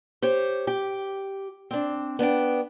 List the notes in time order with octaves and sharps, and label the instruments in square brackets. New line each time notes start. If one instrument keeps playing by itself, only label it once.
[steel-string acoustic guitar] G4 C5 C#5
G4
C4 D4
B3 D4 D5 G5